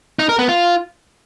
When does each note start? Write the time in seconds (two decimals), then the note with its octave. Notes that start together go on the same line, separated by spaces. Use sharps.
0.19 D#4
0.29 A#4
0.39 B3
0.49 F4